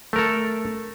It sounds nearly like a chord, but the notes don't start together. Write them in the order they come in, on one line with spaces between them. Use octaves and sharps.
A3 A#4 A4